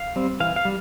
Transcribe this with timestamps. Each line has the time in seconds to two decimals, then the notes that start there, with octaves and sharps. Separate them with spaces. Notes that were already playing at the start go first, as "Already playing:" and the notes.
Already playing: F5
0.16 G3 C4
0.40 E3 F5
0.56 F5
0.65 G3